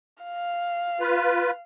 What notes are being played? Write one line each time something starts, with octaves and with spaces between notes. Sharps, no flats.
F5
F4 B4